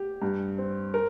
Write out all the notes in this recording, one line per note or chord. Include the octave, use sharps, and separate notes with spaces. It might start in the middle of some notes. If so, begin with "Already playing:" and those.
Already playing: G4
G2
C4
A#4